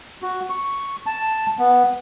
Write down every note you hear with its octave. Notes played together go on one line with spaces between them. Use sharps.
F#4
C#6
A5
B3